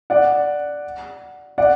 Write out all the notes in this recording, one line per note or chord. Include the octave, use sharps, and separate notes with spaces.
D5 F#5
D5 F#5